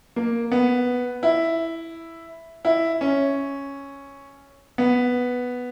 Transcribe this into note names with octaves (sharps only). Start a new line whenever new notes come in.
A#3
B3
E4
E4
C#4
B3